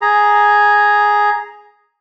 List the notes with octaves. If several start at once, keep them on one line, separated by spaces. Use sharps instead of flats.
G#4 A#5